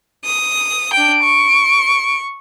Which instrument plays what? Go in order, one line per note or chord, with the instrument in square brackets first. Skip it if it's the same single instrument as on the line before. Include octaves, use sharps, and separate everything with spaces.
[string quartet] D#6
[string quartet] D4 G5 [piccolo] D7
[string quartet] C#6